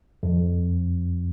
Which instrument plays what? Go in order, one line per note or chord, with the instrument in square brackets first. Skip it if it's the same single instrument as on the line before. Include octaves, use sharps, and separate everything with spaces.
[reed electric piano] F2